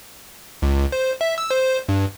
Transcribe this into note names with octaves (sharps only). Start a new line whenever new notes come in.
C#2
C5
E5
E6
C5
G2